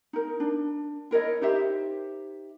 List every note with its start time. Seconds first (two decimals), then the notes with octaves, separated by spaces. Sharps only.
0.13 D#4 A#4
0.40 D4
1.11 E4 A#4 C#5 D#5
1.41 D#4 G4 C5 E5